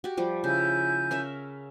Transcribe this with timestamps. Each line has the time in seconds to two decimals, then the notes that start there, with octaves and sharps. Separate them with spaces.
0.04 F#4 G4
0.17 F3 G3
0.44 C#3 E4 G#5 G6
1.11 C#4 A#4 E5